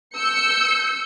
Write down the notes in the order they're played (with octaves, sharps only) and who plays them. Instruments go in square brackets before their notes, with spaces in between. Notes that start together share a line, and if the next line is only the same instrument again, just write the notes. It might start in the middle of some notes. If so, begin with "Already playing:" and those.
[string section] E6 G6 C#7